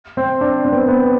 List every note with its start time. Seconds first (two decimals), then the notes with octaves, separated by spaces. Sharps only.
0.17 C4
0.41 D4
0.65 C4
0.72 B3
0.80 C4
0.88 B3